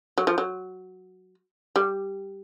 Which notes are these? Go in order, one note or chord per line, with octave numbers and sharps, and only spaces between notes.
F#3
F3
F#3
G3